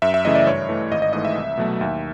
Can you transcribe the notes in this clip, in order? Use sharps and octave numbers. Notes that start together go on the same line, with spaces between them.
F#2 E5
E5
C#3 E3 A3 D#5
D5
G2 C#5
E3 A3
G#1 D#5
D#5
G#2 E3 A3 D#5
E5
C2
B2 F#3 A3
D#2